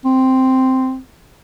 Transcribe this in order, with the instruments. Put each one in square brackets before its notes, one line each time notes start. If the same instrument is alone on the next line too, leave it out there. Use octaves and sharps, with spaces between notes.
[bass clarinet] C4